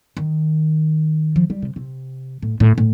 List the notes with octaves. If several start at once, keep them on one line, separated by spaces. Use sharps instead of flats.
D#3
F3
G3
C3
C3
A2
A2
A2